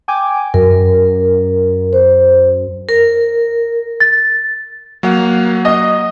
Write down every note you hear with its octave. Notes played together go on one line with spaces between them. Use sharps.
G5 G#5 D6
F#2 A#4
C5
A#4
A6
F#3 A#3 F#5
D#5